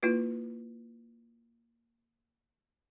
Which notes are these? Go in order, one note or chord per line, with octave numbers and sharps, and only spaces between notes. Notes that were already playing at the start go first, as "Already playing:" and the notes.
A#3 E4 F4 B4